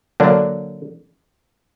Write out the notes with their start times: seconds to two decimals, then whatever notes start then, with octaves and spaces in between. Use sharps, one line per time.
0.20 D3 F#3 A#3 D4